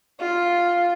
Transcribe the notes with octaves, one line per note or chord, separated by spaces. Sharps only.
F4